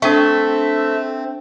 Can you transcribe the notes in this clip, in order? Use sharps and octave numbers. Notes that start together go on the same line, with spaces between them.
A3 C4 D4 E5 G5 C#6